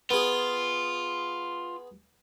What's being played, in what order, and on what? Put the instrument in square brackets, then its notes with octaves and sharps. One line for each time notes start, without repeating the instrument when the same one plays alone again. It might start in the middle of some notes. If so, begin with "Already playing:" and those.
[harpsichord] B3 G#4 [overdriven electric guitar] F4